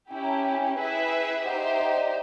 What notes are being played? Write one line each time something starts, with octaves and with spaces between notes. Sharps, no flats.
C#4 E4 G4 G5
A#5
A5
G5
G#5
G5
E4 G#4 B4 E5
D#4 G4 C5 F#5
E5
D#5
D5